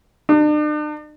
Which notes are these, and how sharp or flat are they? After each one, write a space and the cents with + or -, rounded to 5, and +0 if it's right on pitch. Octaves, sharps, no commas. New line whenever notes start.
D4 +45